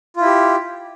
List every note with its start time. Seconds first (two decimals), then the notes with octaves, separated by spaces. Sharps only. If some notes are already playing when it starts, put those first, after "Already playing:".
0.16 F4
0.21 E4
0.25 G4